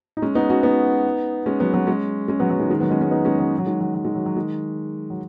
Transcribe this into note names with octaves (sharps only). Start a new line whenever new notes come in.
D#4
G#3 C#4
B3 D#4
C#4 F#4
B3 D#4
G#3 C#4
F#3 B3
F#3 B3
G#3 C#4
G#3 C#4
F#3 B3
F#3
D#3 G#3
D#3 G#3
F#3 B3
G#3 C#4
G#3 C#4
B3 D#4
G#3 C#4
F#3 B3
F#3
D#3 G#3
F#3
F#3
D#3 G#3
F#3
F#3
D#3 G#3
F#3